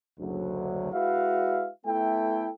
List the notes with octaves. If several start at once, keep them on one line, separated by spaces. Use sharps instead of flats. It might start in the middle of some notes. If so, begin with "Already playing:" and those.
F#1 D2 F#3
G#3 E4 F#4 B4 E5 F5
A3 B3 E4 A4 E5 G5